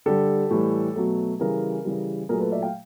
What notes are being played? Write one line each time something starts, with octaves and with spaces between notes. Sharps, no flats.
D3 G3 G4 A4
A2 E3 G3
B2 F#3 A3
C#3 E3 G3 G#4 A#4
C#3 E3 G3
A#2 F#3 A3 G#4 A#4
A4 B4
D5 E5
F5 G5